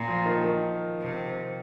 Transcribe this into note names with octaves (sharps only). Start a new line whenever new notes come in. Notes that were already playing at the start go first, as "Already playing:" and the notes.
Already playing: A#2
F3
D#3
D#3
C3